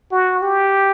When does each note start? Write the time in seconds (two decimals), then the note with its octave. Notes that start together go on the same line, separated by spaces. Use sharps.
0.12 F#4
0.42 G4